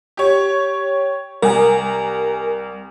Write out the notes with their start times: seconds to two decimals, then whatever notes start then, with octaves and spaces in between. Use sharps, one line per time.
0.17 G4 C#5
1.42 C2 A#4 G#5